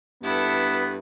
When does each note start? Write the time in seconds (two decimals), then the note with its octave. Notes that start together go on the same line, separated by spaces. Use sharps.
0.23 G2 B3 E4 A4